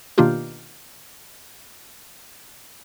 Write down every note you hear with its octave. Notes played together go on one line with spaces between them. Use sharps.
B2 D#3 A#3 D4 F4 G4